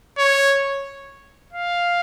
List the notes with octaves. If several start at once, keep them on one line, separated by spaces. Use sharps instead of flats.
C#5
F5